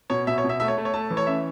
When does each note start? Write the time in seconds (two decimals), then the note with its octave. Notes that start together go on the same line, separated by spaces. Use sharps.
0.10 B2 C#5
0.27 B2 E5
0.38 C#5
0.44 B2
0.49 E5
0.60 A3 E5
0.68 C#5
0.77 A3
0.85 C#5
0.94 A3 A5
1.10 E3
1.17 C#5
1.27 C#4 E5